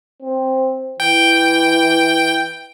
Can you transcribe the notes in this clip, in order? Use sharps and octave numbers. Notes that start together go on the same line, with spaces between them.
C4
E3 G5